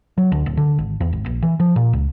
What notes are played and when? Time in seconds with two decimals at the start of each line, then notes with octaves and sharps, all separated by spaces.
0.18 F#3
0.32 D2
0.46 D1
0.57 D3
0.78 G#1
1.01 E2
1.13 G#1
1.26 A#1
1.43 E3
1.60 F3
1.76 A#2
1.93 C#2